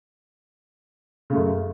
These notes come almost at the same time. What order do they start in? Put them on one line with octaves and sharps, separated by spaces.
C#3 A3 F#2